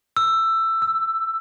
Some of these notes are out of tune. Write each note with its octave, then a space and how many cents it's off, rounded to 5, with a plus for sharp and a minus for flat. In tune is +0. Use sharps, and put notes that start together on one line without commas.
E6 +10
E6 -10